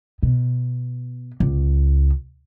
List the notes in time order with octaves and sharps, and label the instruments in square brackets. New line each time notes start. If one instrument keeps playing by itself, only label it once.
[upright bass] B2
C#2